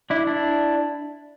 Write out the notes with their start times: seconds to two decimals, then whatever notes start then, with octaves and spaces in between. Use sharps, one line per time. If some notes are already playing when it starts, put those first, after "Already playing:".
0.10 D4 E4
0.27 D4 E4